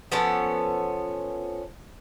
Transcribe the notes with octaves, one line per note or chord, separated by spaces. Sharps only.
F3 B3 C#4 A4